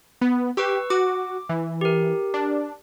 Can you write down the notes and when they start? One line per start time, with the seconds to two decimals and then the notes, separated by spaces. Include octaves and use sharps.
0.21 B3
0.57 G4 B4 C#6 E6
0.90 F#4 D6
1.49 E3
1.81 G4 A#4
2.34 D4